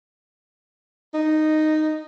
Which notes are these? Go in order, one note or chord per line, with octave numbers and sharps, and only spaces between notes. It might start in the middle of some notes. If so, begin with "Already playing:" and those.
D#4